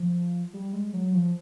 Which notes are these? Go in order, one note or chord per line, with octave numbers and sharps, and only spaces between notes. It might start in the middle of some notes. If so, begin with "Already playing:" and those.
Already playing: F3
G3
G#3
F#3
F3